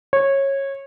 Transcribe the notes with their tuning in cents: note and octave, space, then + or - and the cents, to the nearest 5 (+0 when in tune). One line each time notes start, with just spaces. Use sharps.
C#5 -20